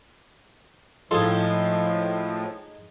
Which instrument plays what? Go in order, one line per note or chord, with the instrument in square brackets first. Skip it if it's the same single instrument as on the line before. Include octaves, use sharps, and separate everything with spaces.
[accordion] A2 F3 [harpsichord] G#3 D#4 G#4 [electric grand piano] F4 A4 C6